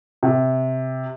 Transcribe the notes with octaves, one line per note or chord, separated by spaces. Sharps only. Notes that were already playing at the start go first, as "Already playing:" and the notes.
C3